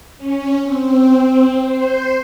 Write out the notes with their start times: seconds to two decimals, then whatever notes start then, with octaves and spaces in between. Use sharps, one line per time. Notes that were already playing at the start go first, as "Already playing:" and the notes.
0.18 C#4
0.64 C4
1.66 C5